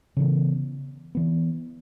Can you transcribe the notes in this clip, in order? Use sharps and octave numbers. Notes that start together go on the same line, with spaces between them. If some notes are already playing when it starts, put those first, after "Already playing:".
C#3 E3 B3
E3 B3